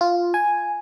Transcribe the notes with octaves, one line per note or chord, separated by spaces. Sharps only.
F4
G#5